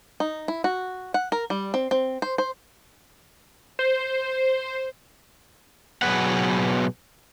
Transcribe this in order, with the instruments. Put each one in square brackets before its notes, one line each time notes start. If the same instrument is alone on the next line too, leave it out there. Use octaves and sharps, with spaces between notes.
[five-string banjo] D#4
E4
F#4
F#5
A#4
G3
C4
C4
C5
C5
[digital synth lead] C5
[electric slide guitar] B2 F#3 G#4 B4 F#5